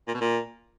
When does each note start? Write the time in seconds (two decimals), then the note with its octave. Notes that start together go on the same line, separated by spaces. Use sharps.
0.08 A#2
0.14 B2
0.21 A#2